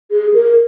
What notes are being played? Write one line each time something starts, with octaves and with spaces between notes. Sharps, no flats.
G#4
A#4